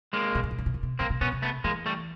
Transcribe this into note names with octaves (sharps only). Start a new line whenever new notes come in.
G#3 A#3
C3
C#3
C3
C#3
C3
C#3
C3
C#3 A#3 C4
C3
B2 B3 C#4
C3
A3 B3
E3 G#3 A#3
G3 A3